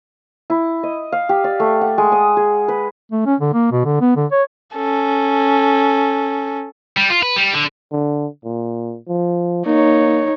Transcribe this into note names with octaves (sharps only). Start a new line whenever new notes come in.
E4
D#5
F5
G4
D5
A3
F#5
G#3
D#6
G#4
B4
A3
C#4
D3
A#3
B2
D3
B3
D3
C#5
C#4 A4
G3
F4
B4
G3
D3
D3
A#2
F3
A#3 D#4 C#5